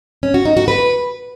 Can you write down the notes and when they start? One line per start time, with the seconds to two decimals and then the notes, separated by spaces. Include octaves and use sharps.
0.23 C#4
0.34 F#4
0.45 D#4
0.57 F#4
0.68 B4